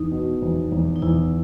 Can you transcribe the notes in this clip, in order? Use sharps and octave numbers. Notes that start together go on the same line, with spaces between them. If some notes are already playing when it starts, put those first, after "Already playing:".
Already playing: E2 D#4
B2
E2
E2
D#4
E2 E4